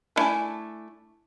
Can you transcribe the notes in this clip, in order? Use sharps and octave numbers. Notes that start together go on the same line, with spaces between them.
E3 A3 D4 E4 G#5